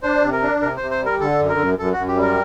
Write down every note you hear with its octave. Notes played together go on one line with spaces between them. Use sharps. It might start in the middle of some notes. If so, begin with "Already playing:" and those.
D4 C5
C3
A#4
D4
C3 A#4
C3 C5
C5
G3 A#4
D3 A4
F#2
A#4
F#2
F#2 A4
F#2 F#4
G4
G3
A#4